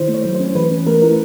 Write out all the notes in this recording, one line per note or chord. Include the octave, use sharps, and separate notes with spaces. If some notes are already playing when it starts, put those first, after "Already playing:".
Already playing: D#3 E4 C5
A3
C#5
F#3
C5
C#4
E3 B4
C#4
A3 A#4
E4 A#4